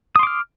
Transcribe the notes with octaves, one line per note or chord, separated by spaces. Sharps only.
C6 D6 D#6 F6